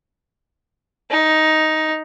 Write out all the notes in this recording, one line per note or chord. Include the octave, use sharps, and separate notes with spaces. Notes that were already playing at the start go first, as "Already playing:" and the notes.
D#4